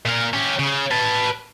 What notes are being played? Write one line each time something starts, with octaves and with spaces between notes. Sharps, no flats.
A#2 A#4
C#4 G4
C#3
B4 A5